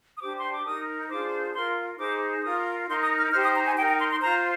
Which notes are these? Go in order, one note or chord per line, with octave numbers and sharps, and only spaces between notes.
D#6
D4 G4 C5 D6
C6
D6
D#4 A#4 D#6
D4 F4 G#4 C5 D6
F4 A#4 C6
D#4 G#4 C5 D6
F4 A#4 D#6
D#4 A#4 C6
D#6
F6
D#4 G4 C5 F6
D#6
A#5
G#5
D#4 A#4 G5
G5
C6
C6
F4 C5 A#5